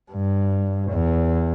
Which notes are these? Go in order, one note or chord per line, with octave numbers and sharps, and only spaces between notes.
G2
E2